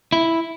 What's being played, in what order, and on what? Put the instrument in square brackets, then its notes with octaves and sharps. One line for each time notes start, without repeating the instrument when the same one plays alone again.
[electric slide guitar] E4